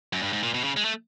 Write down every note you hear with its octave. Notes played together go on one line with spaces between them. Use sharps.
F#2
G2
G#2
A#2
B2
C#3
G#3
A3